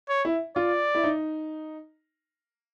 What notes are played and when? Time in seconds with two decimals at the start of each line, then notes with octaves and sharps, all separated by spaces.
0.09 C#5
0.25 E4
0.56 F4 D5
0.95 E4
1.04 D#4